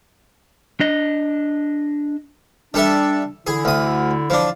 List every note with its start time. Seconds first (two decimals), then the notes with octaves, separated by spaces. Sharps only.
0.80 D4 D#5
2.74 G3 D4 A4 E5
3.47 D3 E4 G#4
3.65 D2 D#6
4.30 F3 D4